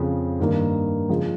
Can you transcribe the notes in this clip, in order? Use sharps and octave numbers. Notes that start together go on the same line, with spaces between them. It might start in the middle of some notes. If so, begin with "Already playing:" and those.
Already playing: F2 C#3 F3
G2 D#3 A#3 D#4
C#3 F3 G#3